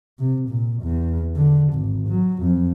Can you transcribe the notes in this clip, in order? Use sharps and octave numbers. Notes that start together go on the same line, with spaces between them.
C3
A#2
E2
D3
G#1
F#3
F2